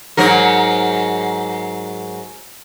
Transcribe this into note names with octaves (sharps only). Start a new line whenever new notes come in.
G#2 F#3 A#4